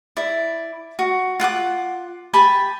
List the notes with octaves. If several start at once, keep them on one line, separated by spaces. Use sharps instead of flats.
E4 D5
F#4
F4 F#5 G#5 D6
G4 G#5 A5 B5